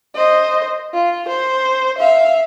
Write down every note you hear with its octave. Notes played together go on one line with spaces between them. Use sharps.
C5 D#5
F4
C5
E5 F5